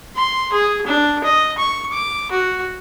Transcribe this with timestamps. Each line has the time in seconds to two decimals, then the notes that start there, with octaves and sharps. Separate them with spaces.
0.16 C6
0.53 G#4
0.87 D4
1.24 D#5
1.58 C#6
1.93 D6
2.31 F#4